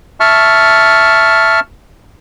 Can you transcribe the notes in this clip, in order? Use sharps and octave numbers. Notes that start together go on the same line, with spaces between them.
E5 A5 C#6 F6